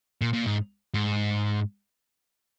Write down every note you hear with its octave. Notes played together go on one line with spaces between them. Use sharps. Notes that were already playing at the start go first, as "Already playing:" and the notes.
A#2
A#2
G#2
G#2